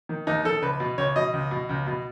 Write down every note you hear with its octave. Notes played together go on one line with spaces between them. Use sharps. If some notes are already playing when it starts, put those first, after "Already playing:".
D#3
D#2 D#4
D#3 A4
C#2 B4
B2
C#2 C#5
B2 D#5
C#2
B2
C#2
B2